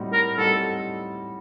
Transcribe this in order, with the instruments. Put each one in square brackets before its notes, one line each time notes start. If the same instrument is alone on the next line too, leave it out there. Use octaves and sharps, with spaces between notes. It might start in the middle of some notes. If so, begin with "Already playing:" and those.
Already playing: [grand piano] A2 G3 C4 D#4 F#4
[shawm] A#4
[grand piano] A2 G3 C4 D#4 F#4 [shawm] A4